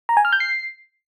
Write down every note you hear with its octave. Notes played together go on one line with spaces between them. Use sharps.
A#5
G#5
F6
G6
C7